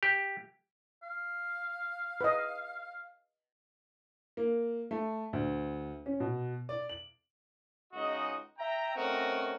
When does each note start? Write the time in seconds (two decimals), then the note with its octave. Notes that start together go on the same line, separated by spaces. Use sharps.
0.03 G4
1.03 F5
2.21 B4 D#5
4.37 A#3
4.91 A3
5.33 D2
6.06 C#4
6.20 B2
6.69 D5
6.89 F#7
7.93 C#2 G#3 D#4 F#4 D#5
8.59 E5 G5 A#5
8.95 A3 C4 C#4 D#4 F#4 A#4